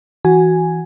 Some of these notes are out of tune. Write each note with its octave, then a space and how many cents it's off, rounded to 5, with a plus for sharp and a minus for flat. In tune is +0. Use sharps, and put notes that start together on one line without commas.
E3 +0 F#4 +0 G#5 +0